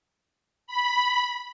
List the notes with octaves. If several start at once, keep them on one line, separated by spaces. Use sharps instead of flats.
B5